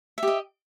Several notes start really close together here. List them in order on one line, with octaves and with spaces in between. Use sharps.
E5 G4 D#5